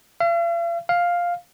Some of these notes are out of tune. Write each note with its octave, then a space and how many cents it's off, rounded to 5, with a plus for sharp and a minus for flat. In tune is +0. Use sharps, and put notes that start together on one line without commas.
F5 -45
F5 +5